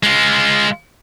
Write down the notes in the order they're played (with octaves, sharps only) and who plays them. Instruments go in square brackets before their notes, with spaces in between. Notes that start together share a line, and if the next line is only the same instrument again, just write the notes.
[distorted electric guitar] G#3 F4